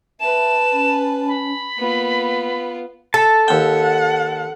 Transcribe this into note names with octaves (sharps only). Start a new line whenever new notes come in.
B4 E5 A5 E7
C#4
B5
A#3 B3 F4
A4 A5
D#2 F#5 G5